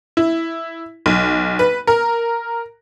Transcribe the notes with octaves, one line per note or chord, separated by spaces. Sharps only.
E4
B1
B4
A#4